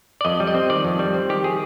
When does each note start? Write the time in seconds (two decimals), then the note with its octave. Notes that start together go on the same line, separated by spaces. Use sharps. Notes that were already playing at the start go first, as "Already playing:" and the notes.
0.21 D5
0.25 F2 D#5
0.40 G3
0.47 D#5
0.55 C4
0.70 D#3 D5
0.84 F2
0.99 G3
1.14 C4
1.29 D#3 G4
1.44 G#4